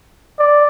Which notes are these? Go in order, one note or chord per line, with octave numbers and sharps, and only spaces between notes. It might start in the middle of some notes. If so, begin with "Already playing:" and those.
D5